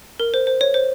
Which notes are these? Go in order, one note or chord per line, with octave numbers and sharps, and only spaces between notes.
A#4
C5
C5
C#5
C5